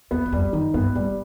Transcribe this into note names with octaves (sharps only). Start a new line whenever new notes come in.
E2 B3
F#2
F2 G3
F#2 D#3
G2 B3
A2 G3